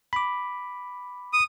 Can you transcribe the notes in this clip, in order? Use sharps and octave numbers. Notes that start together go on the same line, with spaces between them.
B5 D6
D#6